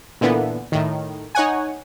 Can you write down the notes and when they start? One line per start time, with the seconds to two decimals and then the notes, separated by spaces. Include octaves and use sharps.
0.21 A#2 D3 E3 B3
0.72 A2 D#3
1.35 D#4 C#5 F#5 G#5